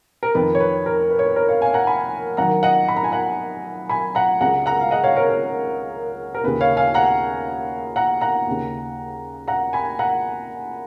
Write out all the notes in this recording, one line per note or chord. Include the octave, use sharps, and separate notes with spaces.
A#4
F2 D#3 B4
C#5
B4
A#4
B4
C#5
B4
A#4 C#5
C#5 F5
F5 G#5
F#5 A#5
G#5 B5
F#2 D#3 F#5 A#5
D#5 F#5
B5
A#5
G#5
F#5 A#5
G#5 B5
F#5 A#5
C#2 C#3 F#5 A#5
F#5 A#5
F5
D#5 F#5
C#5 F5
A#4 C#5
A#4
A#4
D#2 C#3 B4
C#5 F5
F5 G#5
F#5 A#5
F#5 A#5
F#5 A#5
D#2 C#3
F#5 A#5
G#5 B5
F#5 A#5